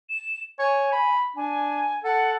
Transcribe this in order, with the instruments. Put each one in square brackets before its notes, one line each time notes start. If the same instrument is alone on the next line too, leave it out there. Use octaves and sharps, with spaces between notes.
[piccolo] E7
[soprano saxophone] C#5 [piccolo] G#5
[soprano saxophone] B5
[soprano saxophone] D4 [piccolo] G#5
[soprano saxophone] A4 [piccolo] F#5